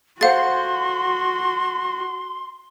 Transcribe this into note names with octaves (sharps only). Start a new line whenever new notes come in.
F#4 A4 C5 F5 F#5 C6 A6